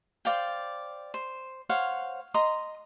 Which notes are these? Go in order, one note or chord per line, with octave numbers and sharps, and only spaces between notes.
C5 D5 F5 G5
C5
C5 C#5 F5 F#5
D#5 A#5 C6 D#6